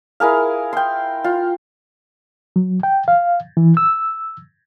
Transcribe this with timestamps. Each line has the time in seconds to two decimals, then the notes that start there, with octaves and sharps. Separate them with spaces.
0.20 E4 G#4 A#4 F5
0.73 G5 C6
1.24 F4
2.56 F#3
2.83 G5
3.08 F5
3.57 E3
3.77 E6